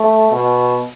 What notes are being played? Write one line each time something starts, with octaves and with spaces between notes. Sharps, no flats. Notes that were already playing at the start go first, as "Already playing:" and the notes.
Already playing: A3
B2